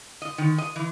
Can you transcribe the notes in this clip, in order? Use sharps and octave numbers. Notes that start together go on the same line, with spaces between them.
D#5
D#3
D#5
E3